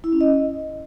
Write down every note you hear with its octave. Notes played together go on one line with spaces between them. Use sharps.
E4
C#4
D#5